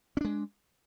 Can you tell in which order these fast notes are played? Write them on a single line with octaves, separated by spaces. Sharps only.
C#4 D4 G#3